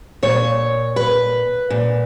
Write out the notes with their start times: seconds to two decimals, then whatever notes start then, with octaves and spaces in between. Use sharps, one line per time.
0.23 A#2 C#5
0.96 B4
1.70 A#2